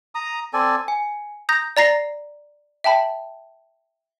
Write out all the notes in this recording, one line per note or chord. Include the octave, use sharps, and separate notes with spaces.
A#5 D#6
C4 A4 D5 G#5
G#5
A#5 D#6 G6 A#6
D5 A#5 A#6 C7
E5 G5 A5 B5